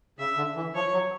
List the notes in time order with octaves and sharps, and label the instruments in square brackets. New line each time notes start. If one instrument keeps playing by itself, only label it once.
[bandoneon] C#3 [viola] E5
[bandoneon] D3
E3
[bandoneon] F3 [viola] C#5
[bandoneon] F#3